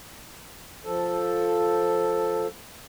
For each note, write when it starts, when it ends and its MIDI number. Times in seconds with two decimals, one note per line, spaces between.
0.85 2.47 53
0.85 2.47 69